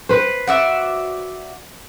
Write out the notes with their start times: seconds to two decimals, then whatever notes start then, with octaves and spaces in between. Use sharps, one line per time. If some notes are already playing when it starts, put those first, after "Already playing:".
0.09 B4 C5
0.47 F#4 D5 E5